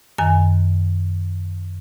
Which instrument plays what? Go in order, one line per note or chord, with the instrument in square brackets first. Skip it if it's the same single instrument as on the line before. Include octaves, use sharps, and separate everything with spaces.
[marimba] F#2 D#3 G#5